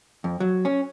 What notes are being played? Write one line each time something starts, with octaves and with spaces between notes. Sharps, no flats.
F2
F#3
C#4